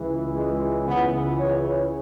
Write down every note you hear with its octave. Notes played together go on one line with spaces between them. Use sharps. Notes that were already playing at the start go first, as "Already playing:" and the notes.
Already playing: C#2 C#3 E3
G#3
C#2 C#3 E3 B3
C#5